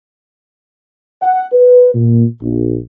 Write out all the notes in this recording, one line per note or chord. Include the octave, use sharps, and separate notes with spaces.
F#5
B4
A#2
A#1